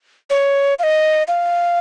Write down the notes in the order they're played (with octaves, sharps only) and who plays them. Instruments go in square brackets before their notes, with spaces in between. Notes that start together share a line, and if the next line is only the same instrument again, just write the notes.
[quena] C#5
F5
D#5
F5